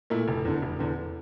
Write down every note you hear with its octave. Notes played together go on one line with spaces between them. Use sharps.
A#2 A3 E4
F1
E2 D3
F1
E2 D3